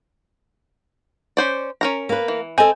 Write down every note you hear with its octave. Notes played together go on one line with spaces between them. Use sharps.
C#4 C5 D5
C#4 A#4 A#5
A#3 B4
E3
C4 A4 D#5 G#5